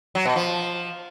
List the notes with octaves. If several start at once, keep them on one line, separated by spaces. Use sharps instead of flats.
F#3
B2
F3